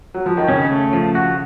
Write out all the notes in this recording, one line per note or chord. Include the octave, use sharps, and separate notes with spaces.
F#3
F3
D#3
C#3 C#4
A3
F3
F#4